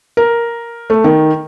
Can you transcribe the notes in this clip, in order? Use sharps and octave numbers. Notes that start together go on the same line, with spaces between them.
A#4
A3
D#3